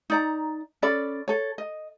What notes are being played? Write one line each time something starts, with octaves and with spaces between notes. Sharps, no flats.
D#4 D5 A#5
C#4 A4 D5 B5
A4 C#5
D#5